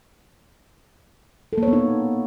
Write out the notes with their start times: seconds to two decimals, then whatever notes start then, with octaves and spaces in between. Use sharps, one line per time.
1.53 A4
1.58 A#3
1.63 C#5
1.68 B3
1.73 D#4